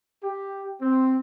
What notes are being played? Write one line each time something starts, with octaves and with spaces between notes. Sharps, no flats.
G4
C4